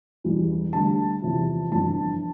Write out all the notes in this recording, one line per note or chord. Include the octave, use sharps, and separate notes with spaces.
E1 E2 E3 G3
D2 D3 G3 A5
E2 C3 F3
G1 F2 E3 A5